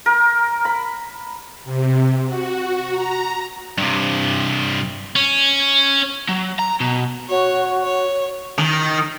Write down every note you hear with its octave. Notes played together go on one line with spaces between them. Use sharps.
A#4
B5
C3
F#4
A#5
G2 C3
C#4
F#3
A#5
B2
F#4 C#5
C#5
D#3